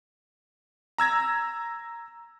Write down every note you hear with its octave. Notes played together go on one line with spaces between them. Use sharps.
A#5 E6 G#6 A#6